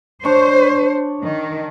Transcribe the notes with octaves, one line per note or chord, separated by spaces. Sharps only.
D4 C5 C#5
D#3